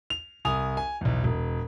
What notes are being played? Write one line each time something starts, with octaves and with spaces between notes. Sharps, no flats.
F7
C2 G#5 D#6 F7
G#5
B1 E2
E1